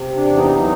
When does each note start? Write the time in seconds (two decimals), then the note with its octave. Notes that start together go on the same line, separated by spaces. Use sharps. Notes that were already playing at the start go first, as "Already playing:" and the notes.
Already playing: C3
0.15 D4
0.26 E2
0.37 D#4
0.59 F#3 D#4